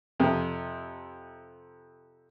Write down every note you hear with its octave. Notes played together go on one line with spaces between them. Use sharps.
F2 C3